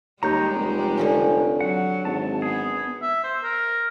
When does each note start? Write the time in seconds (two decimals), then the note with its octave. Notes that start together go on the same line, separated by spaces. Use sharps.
0.23 D#2 G3 G#3 G4 C#5 A#5 G6
0.55 F1
0.97 D3 F3 C#4
1.61 F#3 F#5
2.05 G#1 A5
2.42 B3 G#4
3.02 E5
3.24 C5
3.43 A#4